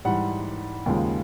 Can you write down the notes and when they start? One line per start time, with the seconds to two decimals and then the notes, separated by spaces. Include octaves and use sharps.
0.05 G#2 E3 G3 F#5
0.86 D#2 C#3 F3 G#3